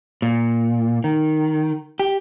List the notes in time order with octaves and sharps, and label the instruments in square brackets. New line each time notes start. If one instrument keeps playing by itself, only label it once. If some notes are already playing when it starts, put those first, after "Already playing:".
[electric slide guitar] A#2
D#3
G4